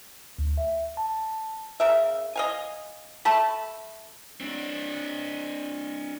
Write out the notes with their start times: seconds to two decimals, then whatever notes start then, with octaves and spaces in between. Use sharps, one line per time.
0.39 D2
0.58 E5
0.97 A5
1.80 C#3 A#4 E5
2.36 D#5 F5 G#5
3.25 A3 A5 B5
4.41 C4 D4